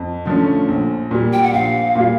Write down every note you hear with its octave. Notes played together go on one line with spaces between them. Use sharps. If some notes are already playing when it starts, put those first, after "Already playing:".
Already playing: F2
D3 F3 A3 C#4
A#1
A#2 G3
G5
F#5
A#1 F5
A#2 G3